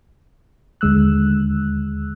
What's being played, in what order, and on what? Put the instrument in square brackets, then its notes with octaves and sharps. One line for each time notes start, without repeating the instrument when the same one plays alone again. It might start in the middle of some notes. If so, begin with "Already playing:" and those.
[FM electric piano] D#2 D3 G#3 E6 F#6